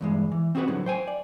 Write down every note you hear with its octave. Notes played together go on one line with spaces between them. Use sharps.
E2 G2 G#3
E3
C4 C#4 F#4 G#4 B4
A2 D3 F3 F#3
C5 G5 G#5
D5